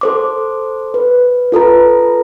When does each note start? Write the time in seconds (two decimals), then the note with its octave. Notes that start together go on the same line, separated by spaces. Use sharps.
0.01 A4 C5 D6
0.94 B4
1.52 F4 A4 B4 A#5